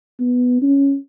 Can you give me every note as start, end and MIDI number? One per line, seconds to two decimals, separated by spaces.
0.20 0.61 59
0.62 0.96 61